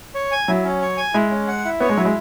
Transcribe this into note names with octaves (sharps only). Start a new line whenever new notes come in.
C#5
G#5
F#3 E4
C#4
C#5
G#5
G#3 E4
C#4
F#5
E4
B3 C#5
G#3
F#3 E4
G#3